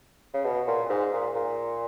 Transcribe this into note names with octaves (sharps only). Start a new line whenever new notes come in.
C#3
B2
A#2
G#2
A#2
A#2